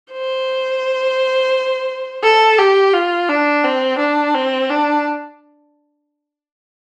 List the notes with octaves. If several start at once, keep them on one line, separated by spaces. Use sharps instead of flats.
C5
A4
G4
F4
D4
C4
D4
C4
D4